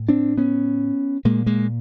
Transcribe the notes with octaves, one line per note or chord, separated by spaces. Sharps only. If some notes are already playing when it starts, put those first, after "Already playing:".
Already playing: A2
C4 D4
B3 C#4
A#2 G#3 A#3
G#3 A#3